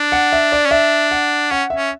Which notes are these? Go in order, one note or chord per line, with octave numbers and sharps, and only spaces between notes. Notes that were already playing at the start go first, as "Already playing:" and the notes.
Already playing: D4
F#5
E5
D5
C#4
D4 E5
F#5
C#4 F#5
E5
C#4